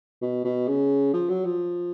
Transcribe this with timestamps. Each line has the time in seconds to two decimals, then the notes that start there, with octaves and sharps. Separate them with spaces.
0.22 B2
0.44 B2
0.67 C#3
1.13 F3
1.29 F#3
1.45 F3